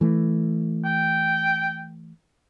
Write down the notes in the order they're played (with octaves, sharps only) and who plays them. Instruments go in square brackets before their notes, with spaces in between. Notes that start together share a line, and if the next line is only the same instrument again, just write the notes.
[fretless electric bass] E3 A3
[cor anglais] G5